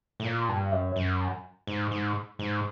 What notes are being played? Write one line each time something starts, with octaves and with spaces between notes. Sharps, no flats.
A2
A#2
G2
F#2
F#2
G#2
G#2
G#2